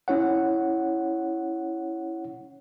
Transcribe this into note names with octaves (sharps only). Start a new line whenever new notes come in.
C#4 E4 C#5 F#5